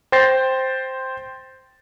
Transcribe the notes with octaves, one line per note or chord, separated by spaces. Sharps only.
C5 G5 G6 A6 A#6 C7